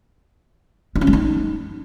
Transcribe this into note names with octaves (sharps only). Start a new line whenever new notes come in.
D#4
C#4
G#3
D#4